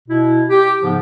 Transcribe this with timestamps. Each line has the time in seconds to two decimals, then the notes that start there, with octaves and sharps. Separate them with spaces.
0.08 B2 E4
0.49 G4
0.83 G#2 C#3 F3 B3